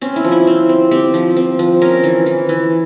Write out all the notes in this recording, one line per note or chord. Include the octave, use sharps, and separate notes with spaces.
C4 C#4
E4
F3
E4
C4
C4
C4 G4
F3
C4
F3
C#4 A#4
E3
E3
E3